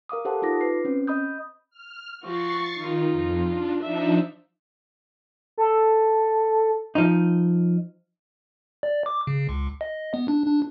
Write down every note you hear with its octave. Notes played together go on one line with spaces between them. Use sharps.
A#4 F5 D6 D#6
G4 A4 C5 F#5 A5
D#4 F4 D6 A#6
B4 C7
C4 C#4 C5
D#5 B5 D#6 G6
F6
F3 F#4 C#6 A6 C7
D#3 D#4 F4
F2
D4
F3 D4 D#4 E5
A4
F3 D#4
D5
D6
C#3
C#2
D#5
B3
D4
D4